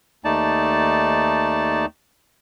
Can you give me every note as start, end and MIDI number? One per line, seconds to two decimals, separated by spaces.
0.24 1.86 39
0.24 1.86 57
0.24 1.86 63
0.24 1.86 74
0.24 1.86 81